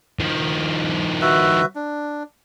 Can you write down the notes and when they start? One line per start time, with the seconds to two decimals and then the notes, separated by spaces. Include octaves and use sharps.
0.19 D#3 F3
1.22 F#4 B4 E5
1.75 D4